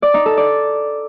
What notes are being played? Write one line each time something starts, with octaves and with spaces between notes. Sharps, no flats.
D5
D#4
A4
D5